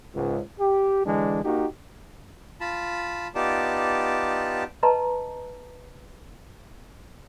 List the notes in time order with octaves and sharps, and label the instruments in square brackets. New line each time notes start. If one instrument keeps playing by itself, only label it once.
[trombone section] C#2 G#2
G4
D3 E3 G#3 D4
A#3 D#4 F#4 G4
[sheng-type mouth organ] F4 A5 B5
B3 D#4 F4 G4 D5 A5
[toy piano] B4 D#5 A5 A#5 C6